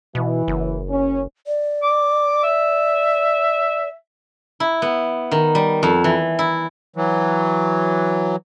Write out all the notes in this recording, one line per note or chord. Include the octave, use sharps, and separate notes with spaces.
B2 E3
F#1
C#4
D5
D6
E5
E4
B3
D#3
G3
F2
E3
E4
E3 F#3